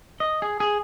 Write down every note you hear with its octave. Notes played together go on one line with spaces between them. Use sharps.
D#5
G#4
G#4